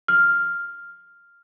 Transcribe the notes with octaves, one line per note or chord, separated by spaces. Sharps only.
F6